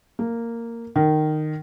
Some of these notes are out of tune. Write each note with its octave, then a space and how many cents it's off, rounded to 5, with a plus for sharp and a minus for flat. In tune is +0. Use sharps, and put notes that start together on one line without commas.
A#3 -10
D#3 -15